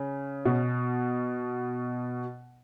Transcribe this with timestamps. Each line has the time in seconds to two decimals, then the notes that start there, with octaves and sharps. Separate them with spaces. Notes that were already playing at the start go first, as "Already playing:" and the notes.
Already playing: C#3
0.45 B2